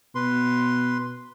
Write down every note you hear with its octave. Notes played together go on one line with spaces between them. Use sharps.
B2 B4 C6